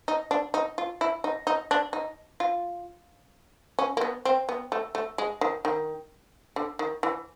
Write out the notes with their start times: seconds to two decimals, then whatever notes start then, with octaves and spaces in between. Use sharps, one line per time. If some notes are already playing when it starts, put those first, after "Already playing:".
0.08 D#4
0.31 D4
0.54 D#4
0.78 F4
1.01 E4
1.24 D#4
1.47 D#4
1.71 D4
1.93 D#4
2.40 F4
3.79 C#4
3.97 A#3
4.01 B3
4.25 C4
4.49 B3
4.72 A3
4.95 A3
5.18 G#3
5.41 D#3
5.65 D#3
6.56 D3
6.79 D#3
7.03 E3